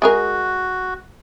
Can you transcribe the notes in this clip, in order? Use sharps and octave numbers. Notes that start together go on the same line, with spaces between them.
G#3 F#4 G#4 A#4